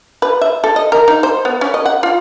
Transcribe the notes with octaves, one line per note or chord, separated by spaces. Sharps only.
B4
E5
A4
D#5
A#4
D#4
C5
B3
C#4
D#5
F#5
F4